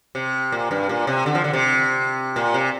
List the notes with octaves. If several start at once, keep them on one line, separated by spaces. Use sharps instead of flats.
C3
A#2
G2
A#2
C3
D3
F3
D3
C3
A#2
C3